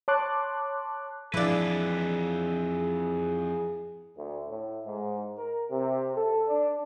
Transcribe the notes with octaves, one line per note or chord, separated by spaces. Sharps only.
C#5 A5 C6 D6 F#6
F2 E3 F3 D4 G#4 B4
D2
A2
G#2
A#4
C3
A4
D4